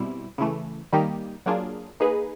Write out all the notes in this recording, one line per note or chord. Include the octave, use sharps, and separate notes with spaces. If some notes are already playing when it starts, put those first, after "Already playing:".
Already playing: B2 G3 C4 E4
C#3 E3 A3
D#3 G3 A#3 D#4 G4
F#3 A#3 D4 F4 G#4
A#3 D#4 G#4 B4